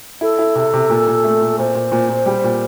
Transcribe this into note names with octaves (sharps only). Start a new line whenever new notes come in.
E4 A4
E4
C3
C3
A#2
A#2
A3
A#2
A#2 C5
A#2
A#2
A#2
G3
A#2